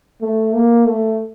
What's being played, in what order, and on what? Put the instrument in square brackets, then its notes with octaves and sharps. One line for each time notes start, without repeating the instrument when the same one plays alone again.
[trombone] A3
A#3
A3